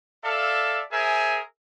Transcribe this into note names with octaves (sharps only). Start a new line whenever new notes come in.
A4 D5 E5 F5
G#4 A#4 C5 E5 G#5